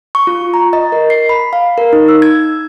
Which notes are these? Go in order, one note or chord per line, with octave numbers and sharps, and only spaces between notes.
C#6
F4
A#5
D#5
A#4
C7
B5
F5
A#4
D#4
E6
G#6